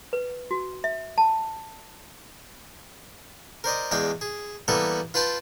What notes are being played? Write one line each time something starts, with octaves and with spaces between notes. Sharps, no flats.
B4
F#4
E5
A5
A#4 C5 D5 D#5
E2 G#3 D5 F5 G5
G#4
E3 G3 A#3 B3 A4 B4
F4 B4 F5 G5 A5 C6